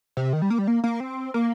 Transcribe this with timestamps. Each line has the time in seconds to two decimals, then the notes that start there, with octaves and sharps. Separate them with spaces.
0.17 C3
0.33 D#3
0.42 G3
0.50 A#3
0.58 G3
0.67 A#3
0.84 A#3
1.00 C4
1.34 A#3